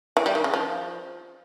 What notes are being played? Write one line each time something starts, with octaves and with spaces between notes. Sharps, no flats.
E3
G3
D#3
C#3
F3